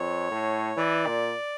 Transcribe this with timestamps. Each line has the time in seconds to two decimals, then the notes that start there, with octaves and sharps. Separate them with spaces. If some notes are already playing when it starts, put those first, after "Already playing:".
Already playing: F2 C#5
0.31 A2
0.77 E3 D5
1.07 A#2